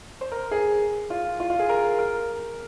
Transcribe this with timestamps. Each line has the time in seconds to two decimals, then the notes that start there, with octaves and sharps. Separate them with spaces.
0.21 C5
0.32 A#4
0.51 G#4
1.10 F4
1.40 F4
1.50 F4
1.59 G#4
1.69 A#4
1.99 A#4